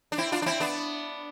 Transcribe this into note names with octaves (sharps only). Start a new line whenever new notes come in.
D4
C4 E4
D4 F4
D4
C4 E4
B3 D4